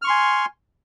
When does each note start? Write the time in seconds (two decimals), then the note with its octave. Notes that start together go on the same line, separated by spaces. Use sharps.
0.02 F6
0.05 C#6
0.07 C6
0.10 G#5